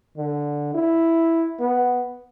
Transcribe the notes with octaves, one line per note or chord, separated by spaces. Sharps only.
D3
E4
B3